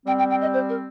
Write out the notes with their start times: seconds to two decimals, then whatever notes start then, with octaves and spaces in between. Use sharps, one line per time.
0.06 G3 C4 G5
0.19 G5
0.30 G5
0.42 D#5
0.53 C5
0.69 A#4